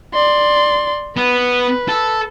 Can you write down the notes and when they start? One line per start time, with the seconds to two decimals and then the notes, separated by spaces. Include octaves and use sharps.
0.14 D5 C6
1.17 B3 B4
1.88 A4